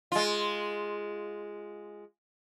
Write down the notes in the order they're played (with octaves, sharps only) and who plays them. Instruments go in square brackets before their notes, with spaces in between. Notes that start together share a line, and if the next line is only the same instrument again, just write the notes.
[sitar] G#3 F4